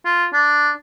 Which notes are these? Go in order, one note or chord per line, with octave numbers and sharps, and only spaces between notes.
F4
D4